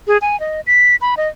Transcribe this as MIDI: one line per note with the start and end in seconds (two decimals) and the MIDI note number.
0.07 0.17 68
0.22 0.39 80
0.40 0.61 75
0.67 0.96 95
1.01 1.15 83
1.17 1.28 75